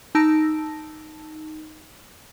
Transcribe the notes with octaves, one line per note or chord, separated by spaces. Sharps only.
D#4 A5 E6 A#6 D7